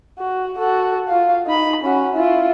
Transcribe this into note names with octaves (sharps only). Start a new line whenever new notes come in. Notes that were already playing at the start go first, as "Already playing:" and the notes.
F#4
F#4 A4
F4 F5
D#4 B5
C#4 F#4
E4 F4